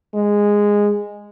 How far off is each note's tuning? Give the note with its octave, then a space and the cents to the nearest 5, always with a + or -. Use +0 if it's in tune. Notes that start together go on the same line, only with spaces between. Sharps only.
G#3 -10